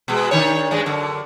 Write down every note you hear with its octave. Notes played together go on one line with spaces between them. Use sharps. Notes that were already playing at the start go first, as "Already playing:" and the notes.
B2 G#3
D#3 D4 C#5
G2 G#3 D4
F#2 D3